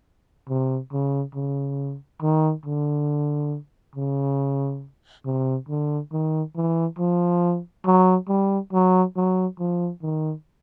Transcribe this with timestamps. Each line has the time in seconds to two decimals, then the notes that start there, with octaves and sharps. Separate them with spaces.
0.49 C3
0.93 C#3
1.35 C#3
2.22 D#3
2.65 D3
3.95 C#3
5.26 C3
5.69 D3
6.12 D#3
6.56 E3
6.99 F3
7.86 F#3
8.28 G3
8.73 F#3
9.16 F#3
9.59 F3
10.02 D#3